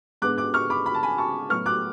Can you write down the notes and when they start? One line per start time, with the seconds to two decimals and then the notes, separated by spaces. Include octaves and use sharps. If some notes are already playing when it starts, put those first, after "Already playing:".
0.22 G#2 G#3 B3 D4 D6 F#6
0.38 D6 F#6
0.54 C#6 F6
0.70 B5 D6
0.86 B5
0.94 A5
1.03 G#5 B5
1.18 A5 C#6
1.50 A2 F#3 B3 C#6 F6
1.66 D6 F#6